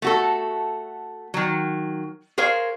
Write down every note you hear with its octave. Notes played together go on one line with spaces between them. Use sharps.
A3 F#4 A4
D#3 F#3
G#4 A#4 C5 C#5 F5